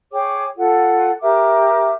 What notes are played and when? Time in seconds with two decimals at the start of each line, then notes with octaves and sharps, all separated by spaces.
0.13 G#4 C#5 G5 D6
0.57 F4 A4 F#5
1.21 G4 A#4 E5 D6